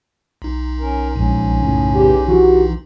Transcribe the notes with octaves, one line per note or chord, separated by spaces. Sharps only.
B1 D#4
C#4 A#4
A#1 G#2 C#4
F#1 A2 C#3
E2 G4
E3 F#4 G4